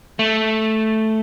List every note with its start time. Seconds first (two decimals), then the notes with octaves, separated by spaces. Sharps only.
0.19 A3